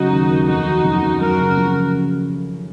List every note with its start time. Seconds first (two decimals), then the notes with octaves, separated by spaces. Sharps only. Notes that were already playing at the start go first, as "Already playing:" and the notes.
Already playing: C#3 F#3 D#4 F#4
0.12 D#2
0.30 D#2
0.48 F2 D#4 F#4
0.66 D#3
0.84 F#1
1.03 F#1
1.21 F#2 F#4 A#4
1.39 C#3
1.57 F3